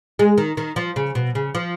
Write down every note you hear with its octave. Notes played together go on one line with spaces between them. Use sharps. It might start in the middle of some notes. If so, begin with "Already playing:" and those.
G#3
D#3
D#3
F3
C#3
B2
C#3
F3